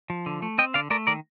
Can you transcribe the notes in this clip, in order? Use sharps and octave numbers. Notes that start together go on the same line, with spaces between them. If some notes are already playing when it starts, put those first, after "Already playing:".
F3
D3
A3
C4 D#5 G5
D3 D5 F5
A3 A#4 D5
D#3 A#4 D5